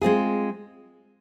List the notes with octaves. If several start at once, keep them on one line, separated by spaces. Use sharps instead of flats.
G#3 C4 F4 G#4